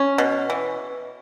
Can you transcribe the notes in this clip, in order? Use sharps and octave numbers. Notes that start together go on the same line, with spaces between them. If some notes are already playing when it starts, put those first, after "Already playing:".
Already playing: C#4
B2
E3